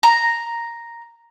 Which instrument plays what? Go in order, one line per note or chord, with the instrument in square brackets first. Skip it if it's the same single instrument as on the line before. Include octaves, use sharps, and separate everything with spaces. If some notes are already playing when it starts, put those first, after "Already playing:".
[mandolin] A#5